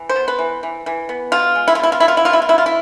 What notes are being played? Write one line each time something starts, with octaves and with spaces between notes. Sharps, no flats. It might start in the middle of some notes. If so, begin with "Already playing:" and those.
Already playing: E3
C5
B3
B4
E3
E3
E3
B3
B2 F4
G#3
E4
F4
B2 E4
F4
B2 E4
F4
E4
B2 F4
E4
F4
B2 E4
F4
E4